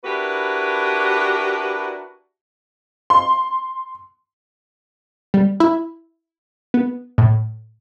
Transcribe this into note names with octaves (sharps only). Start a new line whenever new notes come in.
D4 E4 F#4 G4 A#4 B4
C6
G3
E4
B3
A2